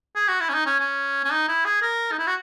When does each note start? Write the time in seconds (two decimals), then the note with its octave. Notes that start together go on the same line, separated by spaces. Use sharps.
0.15 G#4
0.28 F#4
0.41 E4
0.49 C#4
0.54 D#4
0.66 C#4
0.80 C#4
1.24 C#4
1.31 D#4
1.48 E4
1.65 G#4
1.82 A#4
2.12 D#4
2.19 E4
2.27 F#4